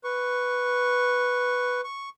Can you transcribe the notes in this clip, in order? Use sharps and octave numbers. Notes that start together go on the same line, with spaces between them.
B4 C#6
C#6